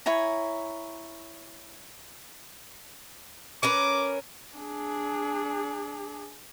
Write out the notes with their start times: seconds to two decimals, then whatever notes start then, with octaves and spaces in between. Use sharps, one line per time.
0.06 E4 C#5 G#5 A#5
3.63 C#4 A#4 B4 D6
4.57 D4 G#4